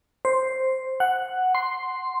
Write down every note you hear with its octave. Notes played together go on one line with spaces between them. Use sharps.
C5
F#5
C6